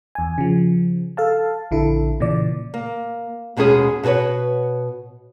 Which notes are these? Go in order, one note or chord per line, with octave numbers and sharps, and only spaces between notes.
E2 G#5
C#3 F3
A4 F5 A5
A#1 D3 E4 A4
A#2 C#3 E3 D5
A#3
D#2 B2 G#3 C#4 G#4 G#5
B2 F#4 G#4 B4 C#5